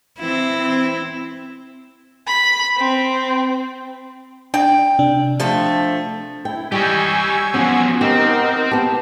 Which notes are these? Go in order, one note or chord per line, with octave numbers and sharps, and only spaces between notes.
E3 C4 E4
C4
B5
C4
D4 G5
C3 D4
F3 A3
E4 G5
G3 G4 D#5 G#5 C#6 E6 G6
F3 F#3 B3 C#4
C4 D#4 G4 A#4
B3 G4 A5